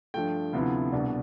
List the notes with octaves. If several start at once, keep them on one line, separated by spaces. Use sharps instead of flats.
G2 F3 A3 G5
D2 C3 F3 B3 E4
C2 B2 B3 D4